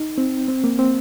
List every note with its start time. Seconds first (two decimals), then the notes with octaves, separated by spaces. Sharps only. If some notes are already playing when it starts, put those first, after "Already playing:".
Already playing: D#4
0.18 C4
0.48 C4
0.64 A#3
0.79 C4